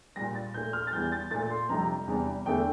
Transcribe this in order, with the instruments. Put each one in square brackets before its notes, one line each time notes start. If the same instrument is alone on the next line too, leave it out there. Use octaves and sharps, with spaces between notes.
[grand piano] A#2 G3 A#6
A6
A#2 A3 G6
F6
A6
E2 E3 G3 G6
A6
A#2 A3 A6
C6
F2 C3 G3 A#5
E2 C3 G3
E2 D3 A3 G5